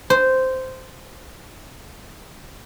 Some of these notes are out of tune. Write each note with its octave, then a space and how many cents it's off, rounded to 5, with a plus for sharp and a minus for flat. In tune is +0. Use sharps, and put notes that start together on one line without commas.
C5 -10